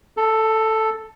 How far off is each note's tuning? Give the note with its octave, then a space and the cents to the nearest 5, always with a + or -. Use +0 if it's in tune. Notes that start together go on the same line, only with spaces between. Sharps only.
A4 +5 A5 +40